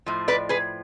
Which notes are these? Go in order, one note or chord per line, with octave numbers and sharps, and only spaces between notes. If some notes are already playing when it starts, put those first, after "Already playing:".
A2 F3
B4 D5
G#4 B4